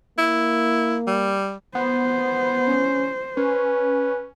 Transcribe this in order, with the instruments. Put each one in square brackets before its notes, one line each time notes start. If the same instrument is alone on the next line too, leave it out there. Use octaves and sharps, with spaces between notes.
[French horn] A#3 [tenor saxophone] E4
[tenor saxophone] G3
[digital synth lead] B3 [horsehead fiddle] C5
[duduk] C#4
[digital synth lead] C#4 [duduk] B4